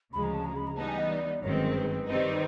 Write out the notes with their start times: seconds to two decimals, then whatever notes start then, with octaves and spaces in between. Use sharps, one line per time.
0.13 D2 C#3 F3 G#3 B5
0.23 A#5
0.34 A5
0.45 A#5
0.57 B5
0.67 A#5
0.77 E3 G3 B3 D#4 A5
0.88 G#5
0.99 D#5
1.10 D5
1.42 G1 F#2 D#3 G#3 C4 C#5
1.53 B4
1.65 A#4
1.76 B4
2.07 D#3 G3 C4 D#4